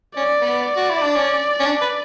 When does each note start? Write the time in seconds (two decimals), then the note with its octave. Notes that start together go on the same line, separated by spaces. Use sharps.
0.16 C#4 D5
0.41 B3
0.65 D5
0.76 F#4
0.90 E4
1.02 D4
1.15 C#4
1.60 C#4
1.65 D4
1.81 B4